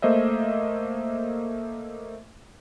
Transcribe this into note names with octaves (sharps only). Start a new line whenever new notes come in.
A3 A#3 C5 D#5 E5